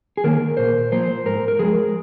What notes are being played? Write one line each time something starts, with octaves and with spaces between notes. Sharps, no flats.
G#4
D#3 A#3 A#4
A#2 C5
F3 A#3 C5
G#2 A#4
A#4
F3 G#3 G#4